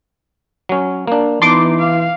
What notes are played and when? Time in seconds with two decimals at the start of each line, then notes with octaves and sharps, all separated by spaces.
0.69 F#3 C#4
1.08 A#3 D4
1.42 E3 B3 D#4 A5 C6 D6
1.79 F5